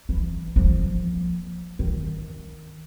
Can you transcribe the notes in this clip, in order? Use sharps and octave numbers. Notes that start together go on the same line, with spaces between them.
E3
F3 A#3
D#3